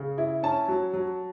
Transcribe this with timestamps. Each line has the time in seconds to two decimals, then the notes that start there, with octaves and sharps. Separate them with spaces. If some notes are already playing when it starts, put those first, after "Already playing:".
Already playing: C#3
0.18 E4
0.43 C#4 A5
0.68 F#3
0.93 F#3